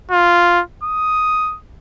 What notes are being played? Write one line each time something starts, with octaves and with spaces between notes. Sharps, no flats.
F4
D#6